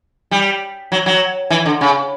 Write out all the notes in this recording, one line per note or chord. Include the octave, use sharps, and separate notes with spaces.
G3
F#3
F#3
E3
D3
C#3